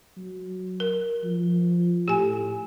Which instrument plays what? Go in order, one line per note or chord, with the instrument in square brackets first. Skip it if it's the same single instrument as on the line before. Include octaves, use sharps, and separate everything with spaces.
[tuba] F#3
[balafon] A#4
[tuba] F3
[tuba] A2 [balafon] G4 G#5